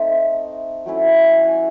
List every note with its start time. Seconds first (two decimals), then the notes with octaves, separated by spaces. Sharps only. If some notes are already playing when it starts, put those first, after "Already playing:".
Already playing: A3 C4 D#4 A5
0.86 F#3 A3 C#4 E4
1.43 F#5 G#5